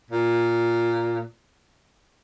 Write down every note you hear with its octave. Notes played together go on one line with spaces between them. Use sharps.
A#2